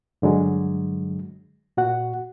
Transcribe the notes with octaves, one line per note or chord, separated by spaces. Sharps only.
G2 D3 F#3 G#3
A#2 F#4 F#5